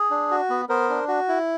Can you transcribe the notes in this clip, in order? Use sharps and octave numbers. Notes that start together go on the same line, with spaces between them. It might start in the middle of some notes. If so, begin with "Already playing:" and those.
Already playing: G#4
D4
F#4
B3
B3 A#4 C5
D4
F#4
E4